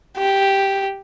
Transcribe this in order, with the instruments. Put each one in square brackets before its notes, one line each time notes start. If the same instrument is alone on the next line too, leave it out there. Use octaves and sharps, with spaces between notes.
[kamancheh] G4